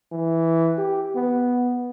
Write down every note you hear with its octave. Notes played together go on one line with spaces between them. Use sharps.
E3
G4
B3